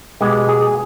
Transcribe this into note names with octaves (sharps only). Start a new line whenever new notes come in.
B2 G#3 B3 G4
G#4